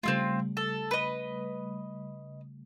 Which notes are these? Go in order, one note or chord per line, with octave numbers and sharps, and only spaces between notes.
C#3 G3 A3 C4 E4 F4
A4
B4 D#5